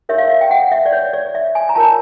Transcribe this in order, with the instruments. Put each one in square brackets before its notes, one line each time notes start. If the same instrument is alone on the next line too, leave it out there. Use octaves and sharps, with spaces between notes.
[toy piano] D4 G4 A#4 C#5 E5
F5
E5
G5
F#5
E5
D5
C#5
D5
E5
G#5
A#5
F4 A#4 C#5 A5